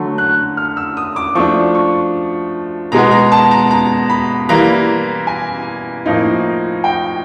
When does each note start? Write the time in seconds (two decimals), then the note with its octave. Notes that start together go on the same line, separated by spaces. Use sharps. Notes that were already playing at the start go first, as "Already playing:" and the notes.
Already playing: D3 F#3 A3
0.18 F#6
0.57 F6
0.77 E6
0.97 D#6
1.16 D6
1.35 F3 A3 D4 C#6
1.75 C#6
2.92 B2 G#3 B3 A#5
3.11 A#5
3.32 A5
3.51 A#5
3.71 A#5
4.09 B5
4.49 E3 G3 A#3 A#5
5.27 G#5
6.06 A2 F3 A#3 D#4
6.84 G5